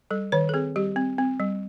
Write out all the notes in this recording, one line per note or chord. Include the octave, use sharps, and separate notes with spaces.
G3 A4
D#3 C#5
A4
C4 G#4
G3 G4
C4
C4
G3